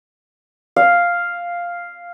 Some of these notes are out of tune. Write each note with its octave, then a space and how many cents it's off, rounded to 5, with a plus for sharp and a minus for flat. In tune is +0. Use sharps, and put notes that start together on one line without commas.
F5 +0